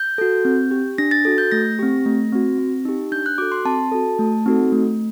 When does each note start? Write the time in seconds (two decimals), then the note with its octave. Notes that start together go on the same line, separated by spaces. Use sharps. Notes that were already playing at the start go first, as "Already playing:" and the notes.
Already playing: G6
0.18 F#4 A4
0.45 C4
0.71 G4
0.98 D4 A#6
1.11 A6
1.25 F#4 A4 A6
1.38 G6
1.52 A3 A#6
1.79 C4 G4
2.06 A3
2.32 C4 F#4
2.58 C4
2.85 D#4 G4
3.12 D4 G6
3.26 F#6
3.38 F#4 A4 D6
3.52 C6
3.65 C4 A5
3.92 F#4 A4
4.19 A3
4.46 C4 D#4 F#4 A4
4.72 A3